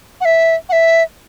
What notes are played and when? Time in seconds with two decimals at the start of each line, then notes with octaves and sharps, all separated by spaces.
0.21 F#5
0.25 E5
0.69 F#5
0.72 E5